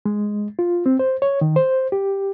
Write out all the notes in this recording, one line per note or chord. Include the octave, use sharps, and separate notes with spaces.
G#3
F4
C4
C5
C#5
D#3
C5
G4